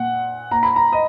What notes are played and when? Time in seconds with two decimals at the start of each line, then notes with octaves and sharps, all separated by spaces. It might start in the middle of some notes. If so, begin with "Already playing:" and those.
Already playing: A#2 F#5
0.51 A#2 A#5
0.63 B5
0.76 A#5
0.93 D#5